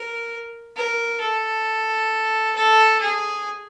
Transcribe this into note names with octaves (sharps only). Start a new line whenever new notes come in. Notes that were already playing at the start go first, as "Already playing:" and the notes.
Already playing: A#4
A#4
A4
A4
G#4